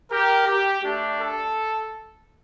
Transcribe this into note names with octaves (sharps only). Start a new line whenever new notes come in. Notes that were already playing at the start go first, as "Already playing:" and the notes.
G4 A#4
G4
A3 D4 G4
A4